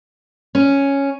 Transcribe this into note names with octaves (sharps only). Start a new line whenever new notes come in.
C#4